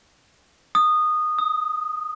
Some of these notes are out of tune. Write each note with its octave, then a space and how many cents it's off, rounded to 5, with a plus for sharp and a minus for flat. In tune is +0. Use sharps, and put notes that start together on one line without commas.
D#6 -15
D#6 +20